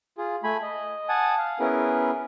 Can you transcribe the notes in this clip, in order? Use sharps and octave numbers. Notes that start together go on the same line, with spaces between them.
F4 G#4
A3 G#5 B5
D#5
F#5 G#5 A5 D#6
F5
B3 C#4 E4 G#4 A#4 B4